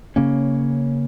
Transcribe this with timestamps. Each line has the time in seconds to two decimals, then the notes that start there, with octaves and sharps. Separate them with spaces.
0.16 C#3 A#3 C#4